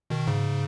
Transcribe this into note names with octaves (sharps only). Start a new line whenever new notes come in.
B2 D#3
G#2 C#3